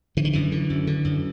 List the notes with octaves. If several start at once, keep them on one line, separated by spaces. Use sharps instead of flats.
D3 E3
D#3
F#2 E3
D3
F#2
D3
F#2